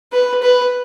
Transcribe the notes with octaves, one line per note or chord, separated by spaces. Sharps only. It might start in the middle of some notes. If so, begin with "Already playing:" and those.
B4
B4